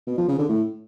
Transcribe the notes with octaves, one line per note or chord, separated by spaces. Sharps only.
B2
F3
C#3
D3
A2